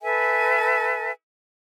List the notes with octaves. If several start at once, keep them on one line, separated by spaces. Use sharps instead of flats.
A4 B4 E5 G#5